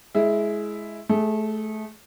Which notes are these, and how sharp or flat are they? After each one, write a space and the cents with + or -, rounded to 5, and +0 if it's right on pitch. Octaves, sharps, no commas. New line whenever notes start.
G#3 +20 E4 +0
A3 -20 G#4 +0